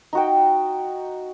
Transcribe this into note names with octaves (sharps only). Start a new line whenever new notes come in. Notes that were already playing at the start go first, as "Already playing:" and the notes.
D#4 F#4 G5